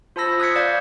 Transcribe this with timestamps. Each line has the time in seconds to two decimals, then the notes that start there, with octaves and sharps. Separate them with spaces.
0.16 F4 C5 A5 B5 E6 A#6
0.39 D#6 F#6 G#6 B6 C#7
0.56 D5 F5 G6 G#6